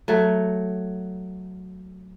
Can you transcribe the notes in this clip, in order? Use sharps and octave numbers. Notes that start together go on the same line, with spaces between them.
F#3 A3